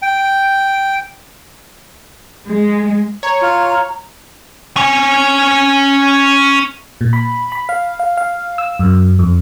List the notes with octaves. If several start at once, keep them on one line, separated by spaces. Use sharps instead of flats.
G5
G#3
C#5 A#5
F4
C#4 G#5
A#2
B5
B5
F5
F5
F5
E6
F#2
F2